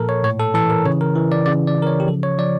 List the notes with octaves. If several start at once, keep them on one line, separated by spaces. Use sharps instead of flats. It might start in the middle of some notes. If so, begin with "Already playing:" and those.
Already playing: A#2 F3 A4 A#4
C#5
A2 C#5
A4
E3 A4
A#4
C#3 C#5
A#4
E3
D5
C#3 D5
D5
C#3
A#4
C#5
G4
F3 A4
C#5
F3 D5